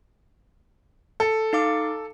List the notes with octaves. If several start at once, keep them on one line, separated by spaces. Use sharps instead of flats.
A4
D#4 F5 D6